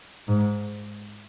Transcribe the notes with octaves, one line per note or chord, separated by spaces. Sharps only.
G#2